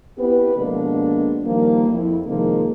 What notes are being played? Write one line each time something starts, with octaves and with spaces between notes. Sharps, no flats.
B3 C4 E4 G4 B4
B2 D3 F3 G#3 A#3 D4
D#3 F3 G3 A#3
F2 E4
C3 D#3 F3 G#3 A#3